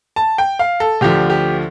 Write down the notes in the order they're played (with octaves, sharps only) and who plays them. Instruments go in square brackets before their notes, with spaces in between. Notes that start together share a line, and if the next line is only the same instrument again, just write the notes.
[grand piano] A5
G5
F5
A4
D2 D3 F3 G4
G4